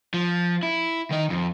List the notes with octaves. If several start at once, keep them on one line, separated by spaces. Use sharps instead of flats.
F3
E4
D#3 D#5
F2